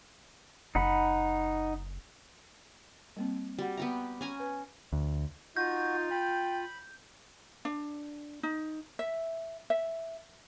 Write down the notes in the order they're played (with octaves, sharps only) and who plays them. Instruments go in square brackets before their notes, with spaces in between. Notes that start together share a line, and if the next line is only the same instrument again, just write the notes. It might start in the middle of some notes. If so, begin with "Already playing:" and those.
[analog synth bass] F#1 [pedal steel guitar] D#4 F#5 B5
[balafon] G3 A#3 C4
[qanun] G3 [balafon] F#4 F#5
[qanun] B3 G4 A#5 [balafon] E5
[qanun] C#4 G#5 A#5
[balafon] B4
[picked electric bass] D2
[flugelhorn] D#4 [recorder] F4 [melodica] F#4 [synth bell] G6
[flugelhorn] G5 [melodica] B5
[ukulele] D4
D#4
E5
E5